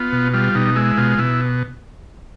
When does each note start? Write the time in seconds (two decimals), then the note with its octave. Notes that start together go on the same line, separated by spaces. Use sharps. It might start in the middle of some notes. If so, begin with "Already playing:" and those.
Already playing: B3 F4
0.12 B2
0.34 G3 F4
0.55 B2 D#4
0.76 G#3 E4
0.97 B2 F4
1.18 B2 E4